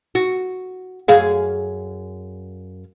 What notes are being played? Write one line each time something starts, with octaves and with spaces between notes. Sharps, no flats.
F#4
F#2 G#4 F5